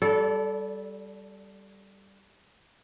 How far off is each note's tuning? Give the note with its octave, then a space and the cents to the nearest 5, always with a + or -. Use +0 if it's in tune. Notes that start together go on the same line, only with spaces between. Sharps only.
G3 +0 A4 -10 D5 -35